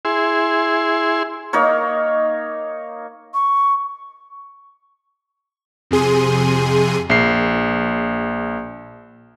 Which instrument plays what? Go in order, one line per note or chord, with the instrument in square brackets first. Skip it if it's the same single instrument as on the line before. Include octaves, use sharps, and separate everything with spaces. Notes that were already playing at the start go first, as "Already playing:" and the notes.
[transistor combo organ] E4 G#4 C6
[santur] A#3 D#4 A#4 C#5
[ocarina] C#6
[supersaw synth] F2 C3 G#4 C6 D#7
[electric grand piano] A#1 C7